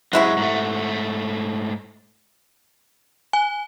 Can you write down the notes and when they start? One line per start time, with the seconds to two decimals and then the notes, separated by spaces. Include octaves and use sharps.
0.13 F#2 C3 G#3 E4 F#4
0.37 G#2 A3
3.33 G#5